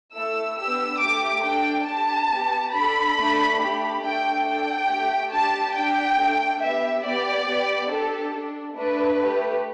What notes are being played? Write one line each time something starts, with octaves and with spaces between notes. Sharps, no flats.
A3 E4 A4 E6
B3 D4 G4 E6
A3 G4 D6
D4 A4 G5
D4 G4 A5
B3 G4
D4 A4 B5
A3 D4 A4
A3 D4 G4
A3 D4 A4 G5
D4 A4 G5
A3 G4
D4 G4 A5
D4 G4 G5
A3 D4 A4
B3 G4 E5
B3 G4 D5
B3 G4
D4 G4 A4
D4 A4
A3 D4 A4 B4
A3 G4